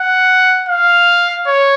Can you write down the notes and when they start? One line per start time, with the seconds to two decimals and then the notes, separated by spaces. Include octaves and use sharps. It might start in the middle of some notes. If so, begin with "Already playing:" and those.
Already playing: F#5
0.69 F5
1.46 C#5